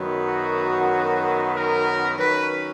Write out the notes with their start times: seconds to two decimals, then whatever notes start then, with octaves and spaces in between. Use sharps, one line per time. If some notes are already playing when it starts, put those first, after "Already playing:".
Already playing: F#2 D#3 F#3 B3
0.27 F#4
1.54 A#4
2.18 D#3 F#3 C#4 B4